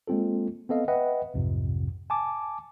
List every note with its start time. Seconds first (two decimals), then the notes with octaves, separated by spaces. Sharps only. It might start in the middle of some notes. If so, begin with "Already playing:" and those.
0.07 G#3 A#3 C4 F4 A4
0.69 B3 C4 A4 D#5 F5
0.88 B4 D#5 E5 F#5 G5
1.34 B1 F2 G#2 C3
2.10 G#5 A5 D6